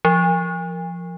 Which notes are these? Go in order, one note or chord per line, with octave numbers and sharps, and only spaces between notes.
F3